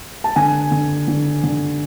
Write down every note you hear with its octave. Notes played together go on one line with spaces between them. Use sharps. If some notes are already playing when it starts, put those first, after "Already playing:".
A5
D3 G#5
D3
D3
D3